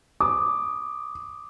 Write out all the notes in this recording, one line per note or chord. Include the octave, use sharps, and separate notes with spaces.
D6 D#6